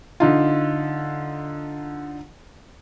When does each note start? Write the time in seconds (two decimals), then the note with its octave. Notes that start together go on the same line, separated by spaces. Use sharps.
0.20 D3 D#4 F4